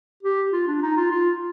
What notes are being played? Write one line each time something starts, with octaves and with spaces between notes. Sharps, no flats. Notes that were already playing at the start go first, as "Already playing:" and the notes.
G4
F4
D4
D#4
F4
F4